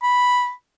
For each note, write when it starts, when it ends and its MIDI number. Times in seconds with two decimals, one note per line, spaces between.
0.02 0.51 83